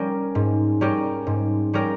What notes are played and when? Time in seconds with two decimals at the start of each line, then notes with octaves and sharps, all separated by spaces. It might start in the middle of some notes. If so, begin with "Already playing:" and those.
Already playing: G3 C#4 G4 A#4
0.35 G#2
0.81 G3 C#4 G4 A#4
1.27 G#2
1.73 G3 C#4 G4 A#4